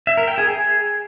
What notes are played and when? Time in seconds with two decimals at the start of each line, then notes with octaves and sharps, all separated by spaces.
0.07 E5
0.17 A#4
0.28 G5
0.38 G#4
0.48 G#4